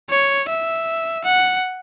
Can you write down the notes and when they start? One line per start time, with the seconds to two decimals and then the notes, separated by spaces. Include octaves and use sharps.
0.10 C#5
0.49 E5
1.25 F#5